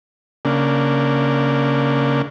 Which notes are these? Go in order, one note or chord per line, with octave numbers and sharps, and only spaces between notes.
C#3 A#3 D4